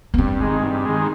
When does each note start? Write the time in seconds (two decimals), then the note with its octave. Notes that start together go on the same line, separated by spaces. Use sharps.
0.14 A#3
0.18 G2 C4
0.41 D#3 G#3
0.63 G2
0.85 D#3 G#3